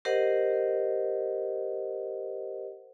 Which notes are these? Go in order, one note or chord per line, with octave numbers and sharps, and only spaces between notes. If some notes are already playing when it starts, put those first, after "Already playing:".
G4 A#4 C5 D#5 F#5